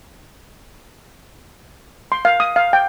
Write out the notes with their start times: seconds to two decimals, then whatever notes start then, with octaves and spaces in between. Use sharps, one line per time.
2.12 C6
2.25 F5
2.40 D#6
2.56 F5
2.73 G5